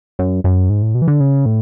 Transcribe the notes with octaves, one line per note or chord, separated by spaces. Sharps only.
F#2
F#2
G#2
A2
B2
E3
D3
C#3
A2